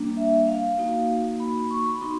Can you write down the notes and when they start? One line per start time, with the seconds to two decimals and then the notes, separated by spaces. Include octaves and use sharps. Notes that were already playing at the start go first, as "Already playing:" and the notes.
Already playing: G3 A#3 D4
0.17 E5
0.48 F5
0.78 A#3 D#4 F#4
1.40 B5
1.71 C#6
1.86 B5
2.01 B3 D#4 F#4 C6